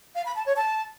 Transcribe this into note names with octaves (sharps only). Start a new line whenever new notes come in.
F5
B5
A5
C#5
A5